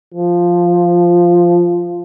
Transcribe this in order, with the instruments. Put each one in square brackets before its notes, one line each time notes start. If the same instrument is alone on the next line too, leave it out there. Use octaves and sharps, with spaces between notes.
[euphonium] F3